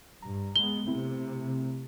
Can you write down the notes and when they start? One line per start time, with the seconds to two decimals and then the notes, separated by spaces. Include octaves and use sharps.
0.22 G2 A#5
0.56 G#3 B3 G7
0.86 C3 A3 C4 E4